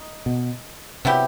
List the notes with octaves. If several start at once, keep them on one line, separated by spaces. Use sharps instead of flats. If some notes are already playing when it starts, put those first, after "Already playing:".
Already playing: D#4
B2
C3 F#3 B3 E4 G4